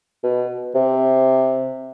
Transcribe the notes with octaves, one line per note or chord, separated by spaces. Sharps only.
B2
C3